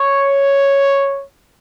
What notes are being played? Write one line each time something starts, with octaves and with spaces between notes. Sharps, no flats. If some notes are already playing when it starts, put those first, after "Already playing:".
Already playing: C#5